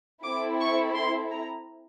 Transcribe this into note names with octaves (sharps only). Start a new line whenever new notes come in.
C4 E4 A4 D6
C#6
C6
A#5